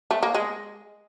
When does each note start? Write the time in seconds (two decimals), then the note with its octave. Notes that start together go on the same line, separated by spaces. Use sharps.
0.11 A3
0.23 A#3
0.35 G#3